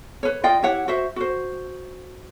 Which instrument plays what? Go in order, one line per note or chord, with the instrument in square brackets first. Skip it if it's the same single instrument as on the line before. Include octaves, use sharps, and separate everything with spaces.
[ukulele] B4 C#5
F4 D5 D#5 G5
E4 G4 C#5 F#5
F#4 C5 E5
F#4 C5